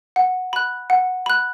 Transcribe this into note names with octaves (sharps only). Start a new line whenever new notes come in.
F#5
B5 F#6
F#5
B5 F#6